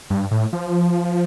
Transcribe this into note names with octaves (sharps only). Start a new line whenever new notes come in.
G2
A2
F3